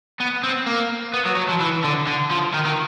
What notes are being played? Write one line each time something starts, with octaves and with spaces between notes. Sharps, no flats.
B3
C4
A#3
B3
F#3
F#3
F3
E3
D3
D3
F3
D#3
D#3